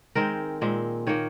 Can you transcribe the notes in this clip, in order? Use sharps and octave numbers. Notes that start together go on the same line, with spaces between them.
D#3 G#3 C4 A#4
A#2 G#3 C4
D#3 A#3 C#5